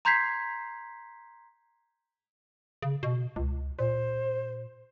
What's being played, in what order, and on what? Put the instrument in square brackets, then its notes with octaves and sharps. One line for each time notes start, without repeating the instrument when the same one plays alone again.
[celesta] A#5 C6 G6 G#6 B6 C7
[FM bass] C#3
B2
C#2
[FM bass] A#2 [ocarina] C5